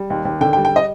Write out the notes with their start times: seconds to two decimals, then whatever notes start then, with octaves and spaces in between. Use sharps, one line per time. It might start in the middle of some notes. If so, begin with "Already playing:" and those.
Already playing: G3
0.10 D#2
0.25 D#2
0.41 D3 G5
0.53 G5
0.57 G3
0.65 G5
0.76 D#5